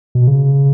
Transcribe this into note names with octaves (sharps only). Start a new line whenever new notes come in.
B2
C#3